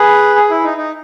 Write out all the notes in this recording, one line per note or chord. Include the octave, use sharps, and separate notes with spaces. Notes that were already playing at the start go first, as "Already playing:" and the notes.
Already playing: G#4 B4
G#4
E4
D#4
D#4